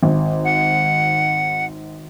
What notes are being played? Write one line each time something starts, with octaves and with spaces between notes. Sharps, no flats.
G#1
F#5